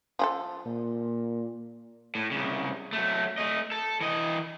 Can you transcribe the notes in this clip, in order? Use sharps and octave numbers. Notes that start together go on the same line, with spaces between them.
F3 G#4 A4
A#2
A2
C2 C#3
F#3 A3
A3 D#5
A4
E3 D#5